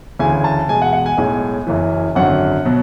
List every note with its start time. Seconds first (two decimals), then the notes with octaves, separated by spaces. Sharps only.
0.19 D2 C#3 E3 G#5
0.44 A5
0.69 E2 B2 G#3 G#5
0.82 F#5
0.93 F#5
1.06 G#5
1.17 B1 A2 G#3
1.67 F#1 F#2 E3
2.15 G#1 F#2 D3 F#3 F#5
2.65 B2 F#3